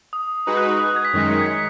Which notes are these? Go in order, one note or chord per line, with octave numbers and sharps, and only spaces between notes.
D#6
G#3 D#4 F#4 B4 D#6
F#6
D#6
D#6
F#6
G#6
B6
F#2 D#3 G#3 D#4
C#7
G#6
B6